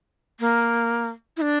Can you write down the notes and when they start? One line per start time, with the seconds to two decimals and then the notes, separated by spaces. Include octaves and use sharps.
0.40 A#3
1.37 E4
1.41 D4